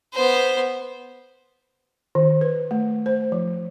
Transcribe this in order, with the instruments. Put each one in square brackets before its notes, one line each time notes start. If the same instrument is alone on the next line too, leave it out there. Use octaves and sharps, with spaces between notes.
[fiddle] B3 C5
[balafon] D#3
B4
A3
C5
F3